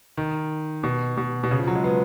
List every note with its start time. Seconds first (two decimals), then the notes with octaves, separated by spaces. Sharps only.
0.17 D#3
0.83 B2
1.17 B2
1.43 B2
1.51 C#3
1.59 F3
1.68 F#3
1.75 G#3
1.84 B3